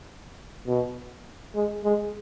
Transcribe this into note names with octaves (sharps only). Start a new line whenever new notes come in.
B2
G#3
G#3